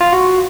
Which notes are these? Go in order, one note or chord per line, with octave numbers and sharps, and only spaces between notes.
F4
F#4